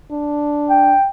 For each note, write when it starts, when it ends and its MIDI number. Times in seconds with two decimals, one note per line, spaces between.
0.12 0.95 62
0.70 1.07 79